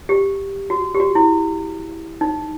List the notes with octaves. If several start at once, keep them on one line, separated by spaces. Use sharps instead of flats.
G4
F#4
G4
F#4
E4
D#4